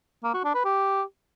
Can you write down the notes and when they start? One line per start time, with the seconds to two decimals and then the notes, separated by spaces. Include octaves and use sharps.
0.24 A#3
0.34 F#4
0.44 D4
0.55 B4
0.65 G4